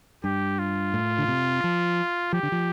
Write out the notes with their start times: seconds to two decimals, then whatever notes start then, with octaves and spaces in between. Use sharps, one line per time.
0.24 G2 G4
0.59 F4
0.93 A2
1.18 D3
1.28 C3
1.64 F3
2.33 F3 G4
2.43 D3
2.52 F3